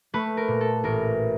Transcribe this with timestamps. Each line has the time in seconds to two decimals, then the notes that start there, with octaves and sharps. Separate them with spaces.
0.14 A3 B4
0.37 A#4
0.48 A#2
0.61 A4
0.84 A1 A#4